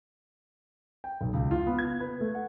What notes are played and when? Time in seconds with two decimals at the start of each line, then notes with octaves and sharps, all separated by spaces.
1.04 G5
1.21 B1
1.33 C#2
1.51 F4
1.67 B3
1.79 G#6
2.00 B4
2.21 A3
2.35 F#5